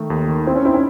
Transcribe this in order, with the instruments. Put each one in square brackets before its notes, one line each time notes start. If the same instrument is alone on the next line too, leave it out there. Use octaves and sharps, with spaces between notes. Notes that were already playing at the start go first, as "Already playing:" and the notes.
Already playing: [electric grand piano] D#3 A3
D#2
D#3
[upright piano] C4 [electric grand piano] E4
[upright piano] C#4
[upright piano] C4 D#4 [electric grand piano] E4
[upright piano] C#4